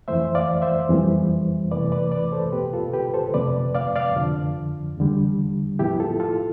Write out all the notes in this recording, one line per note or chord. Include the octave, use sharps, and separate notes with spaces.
F2 E3 A3 C5 E5
D5 F5
C5 E5
F2 E3 G3 B3
E2 C3 E3 A3 B4 D5
B4 D5
B4 D5
A4 C5
B2 B3 G4 B4
F4 A4
G4 B4
A4 C5
F2 C3 F3 A3 B4 D5
D5 F5
D5 F5
F2 D3 F3
E2 D3 G3
A2 F3 B3 E4 G4
F4 A4
F4 A4